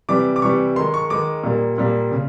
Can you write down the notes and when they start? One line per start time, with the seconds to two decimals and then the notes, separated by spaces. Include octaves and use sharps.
0.09 C3 E3 G3 D6
0.36 D6
0.42 C3 E3 G3 C#6
0.76 D#3 G#3 C6
0.94 C#6
1.10 D#3 G#3 D6
1.44 A#2 G3 A#3
1.78 A#2 G3 A#3
2.11 C#3